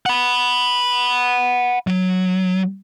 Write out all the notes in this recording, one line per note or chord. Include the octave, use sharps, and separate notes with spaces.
F#5 B5
F#3